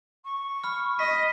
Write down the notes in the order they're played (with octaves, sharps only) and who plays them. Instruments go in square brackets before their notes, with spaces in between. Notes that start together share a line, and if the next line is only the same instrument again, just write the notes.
[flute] C#6
[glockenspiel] B5 F6
[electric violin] D#5 [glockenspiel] B6